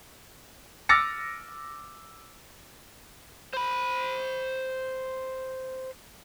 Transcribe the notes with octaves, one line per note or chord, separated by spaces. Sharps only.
D6 E6 F6 A6 A#6 C#7
C5 B5